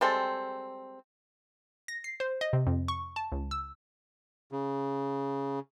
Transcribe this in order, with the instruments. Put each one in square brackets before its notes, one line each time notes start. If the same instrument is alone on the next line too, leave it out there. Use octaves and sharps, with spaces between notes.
[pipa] G3 G#3 C4 A4
[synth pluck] A#6
C7
C5
D#5
C3
F2
C#6
A5
C#2
E6
[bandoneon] C#3